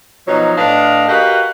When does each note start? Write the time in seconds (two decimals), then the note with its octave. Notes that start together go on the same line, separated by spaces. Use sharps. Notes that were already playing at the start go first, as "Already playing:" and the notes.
0.28 B2 F3 F#3 D#4 C#5 D#5
0.58 A2 D4 B4 D#5 F5
1.09 F#4 G4 A#4 B4 D#5 F5